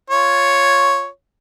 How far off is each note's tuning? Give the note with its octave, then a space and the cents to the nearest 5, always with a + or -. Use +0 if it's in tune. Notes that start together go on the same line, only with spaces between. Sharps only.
F4 +0 C#5 +0